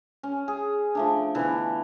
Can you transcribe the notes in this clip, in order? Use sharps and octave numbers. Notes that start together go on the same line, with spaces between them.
C#4
G#4
F3 A3 D4
B2 D3 E3